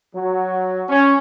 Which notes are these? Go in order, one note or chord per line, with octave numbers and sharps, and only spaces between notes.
F#3
C#4